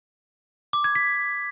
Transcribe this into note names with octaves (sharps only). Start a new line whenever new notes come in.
D6
G#6
B6